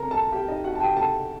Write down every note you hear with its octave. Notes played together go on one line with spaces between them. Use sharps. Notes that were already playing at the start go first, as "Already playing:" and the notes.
Already playing: C4 A4 A#4 A#5
A4 A5
G4 G5
D#4 D#5
F#4 F#5
A5
G4 G5
A4 A5